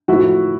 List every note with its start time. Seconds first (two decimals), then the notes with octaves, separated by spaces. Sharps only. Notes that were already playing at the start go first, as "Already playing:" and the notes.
0.08 A2 F3 E4 F#4